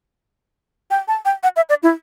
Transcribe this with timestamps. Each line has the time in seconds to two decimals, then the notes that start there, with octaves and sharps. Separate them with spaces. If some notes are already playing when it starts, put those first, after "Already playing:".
0.91 G5
1.08 A5
1.25 G5
1.43 F#5
1.56 E5
1.69 D5
1.83 E4